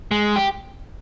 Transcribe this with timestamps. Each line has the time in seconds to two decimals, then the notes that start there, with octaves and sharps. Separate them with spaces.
0.11 G#3
0.36 G4